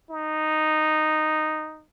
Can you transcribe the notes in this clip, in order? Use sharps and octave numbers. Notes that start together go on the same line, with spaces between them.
D#4